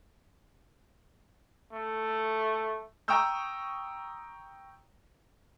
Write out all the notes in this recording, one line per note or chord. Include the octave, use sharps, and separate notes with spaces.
A3
G5 A#5 C#6 D#6 E6 G6